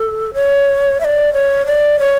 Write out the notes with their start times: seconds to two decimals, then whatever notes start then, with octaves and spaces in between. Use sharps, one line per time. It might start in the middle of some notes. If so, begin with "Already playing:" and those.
Already playing: A4
0.34 C#5
1.00 E5
1.05 D5
1.33 C#5
1.66 D5
1.99 C#5